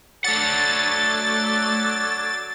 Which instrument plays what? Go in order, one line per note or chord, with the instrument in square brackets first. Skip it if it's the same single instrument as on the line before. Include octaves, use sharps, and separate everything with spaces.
[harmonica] F#3 D4 A4 [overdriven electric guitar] A3 F#5 [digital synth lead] A6